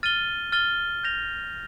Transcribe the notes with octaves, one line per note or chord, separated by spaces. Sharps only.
F6 A6 D#7 G7
F6 A6 D#7 G7
G6 A#6 F7